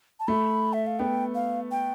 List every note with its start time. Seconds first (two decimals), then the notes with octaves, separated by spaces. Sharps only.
0.20 A5
0.28 A3 B5
0.73 E5
0.87 F5
0.99 B3 G5
1.35 F5
1.71 G5